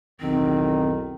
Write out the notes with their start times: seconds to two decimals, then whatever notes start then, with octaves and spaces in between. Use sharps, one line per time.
0.20 B1 E2 D#3 C4